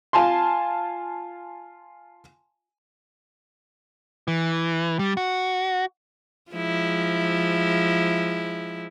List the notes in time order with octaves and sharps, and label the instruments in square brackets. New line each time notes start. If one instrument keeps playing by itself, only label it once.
[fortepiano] F4 G#5 A5 C6
[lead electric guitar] E3
G3
F#4
[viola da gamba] F3 G#3 E4